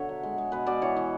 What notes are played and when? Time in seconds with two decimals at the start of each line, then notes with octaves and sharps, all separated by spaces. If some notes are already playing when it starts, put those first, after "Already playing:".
Already playing: B2 D3 C#5 E5
0.09 F#3
0.23 G#3
0.38 G#3
0.52 B2 B4
0.67 B2 D5
0.82 E3 C#5
0.96 E3